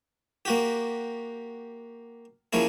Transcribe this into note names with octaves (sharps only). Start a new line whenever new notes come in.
A#3 F#4 G4
F3 A#3 C#4 E4 G#4